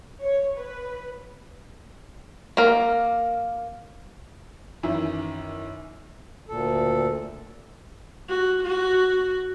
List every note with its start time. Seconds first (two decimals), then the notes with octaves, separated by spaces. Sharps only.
0.21 C#5
0.57 B4
2.57 A#3 A#4
4.83 F#2 D#3 E3 E4
6.49 D2 A#2 A4
8.29 F#4
8.63 F#4